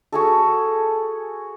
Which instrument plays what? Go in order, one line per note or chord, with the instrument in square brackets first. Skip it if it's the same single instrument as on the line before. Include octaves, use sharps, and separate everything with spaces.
[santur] F#4 G#4 A4